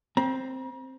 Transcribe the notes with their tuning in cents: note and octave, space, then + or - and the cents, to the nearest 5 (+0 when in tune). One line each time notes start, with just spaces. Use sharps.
C4 +0 A#5 +45